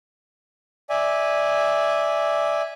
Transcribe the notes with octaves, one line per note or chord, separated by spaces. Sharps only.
D5 E5 G#5